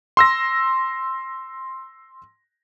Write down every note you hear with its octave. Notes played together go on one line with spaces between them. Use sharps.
C6 E6 A#6